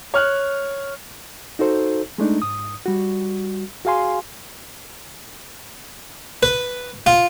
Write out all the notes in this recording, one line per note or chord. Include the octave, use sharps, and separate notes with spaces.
C#5 F6 F#6
D#4 F#4 A4 C5
G#3 A3 D4 D#4
G#2 D#6
G3 F#4
F#4 G#4 F5 G#5 C6
B4
F4